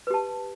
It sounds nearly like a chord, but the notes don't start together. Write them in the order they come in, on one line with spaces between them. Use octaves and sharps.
B4 G4 A5